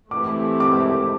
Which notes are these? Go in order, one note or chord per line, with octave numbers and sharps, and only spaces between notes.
E3 A3 C4 E4 G4 D6
D6